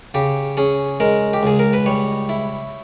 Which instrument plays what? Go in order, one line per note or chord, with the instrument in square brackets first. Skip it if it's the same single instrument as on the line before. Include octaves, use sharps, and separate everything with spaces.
[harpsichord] C#3 G4
C#4 G#4
G#3 A#4
G4
C#2 G#4
A#4
B4
G3 C#5
E4